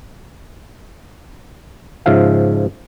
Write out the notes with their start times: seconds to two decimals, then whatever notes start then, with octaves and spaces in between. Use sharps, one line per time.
2.06 G#2 C#3 F3 E5 F5